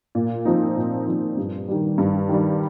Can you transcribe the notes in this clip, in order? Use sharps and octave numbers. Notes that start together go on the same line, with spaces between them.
A#2
F3 C4 D#4
A#2
F3 C4 D#4
G2
D#3 G3
G2
D#3 G3